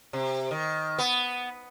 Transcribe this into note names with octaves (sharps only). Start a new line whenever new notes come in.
C3
D#3
B3